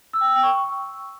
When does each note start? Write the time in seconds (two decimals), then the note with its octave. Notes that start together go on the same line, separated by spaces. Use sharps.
0.13 E6
0.21 G5
0.28 E6
0.36 G5
0.43 C#6